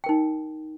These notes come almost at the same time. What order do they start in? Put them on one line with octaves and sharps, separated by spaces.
G5 A#4 D#4